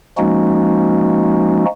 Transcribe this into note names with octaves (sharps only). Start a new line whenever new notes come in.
F3 G#3 A#3 C#4 D#4 F#4